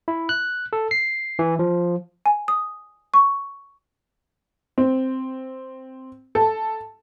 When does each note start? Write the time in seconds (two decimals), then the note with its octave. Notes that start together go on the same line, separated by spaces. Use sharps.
0.08 E4
0.29 F#6
0.73 A4
0.91 C7
1.39 E3
1.59 F3
2.26 G#5
2.48 D#6
3.14 C#6
4.78 C4
6.35 A4